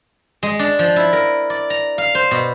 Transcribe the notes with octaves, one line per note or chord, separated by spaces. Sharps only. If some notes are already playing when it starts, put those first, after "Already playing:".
G#3
D4
F3
E4
A#4
D5
A#5
F5
C5
B2